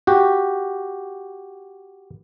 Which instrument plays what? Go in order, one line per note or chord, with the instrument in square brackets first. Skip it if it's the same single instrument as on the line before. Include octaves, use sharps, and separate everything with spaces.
[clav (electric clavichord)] F#4 G4